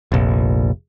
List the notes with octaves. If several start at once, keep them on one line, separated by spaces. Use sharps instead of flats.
F1 A#1